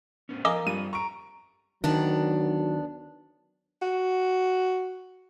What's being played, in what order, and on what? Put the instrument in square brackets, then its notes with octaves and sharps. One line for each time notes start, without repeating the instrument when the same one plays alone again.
[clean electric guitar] A2 B3 C#4
[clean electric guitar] F3 [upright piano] A#4 F5 G#5 [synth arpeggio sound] D#5 D6 E6
[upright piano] G2 [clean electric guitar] F4 A4 [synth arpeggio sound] D#7
[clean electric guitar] A#5 [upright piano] C#6 D7
[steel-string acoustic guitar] D2 B3 D4 [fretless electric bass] D#3 [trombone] F#3
[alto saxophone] F#4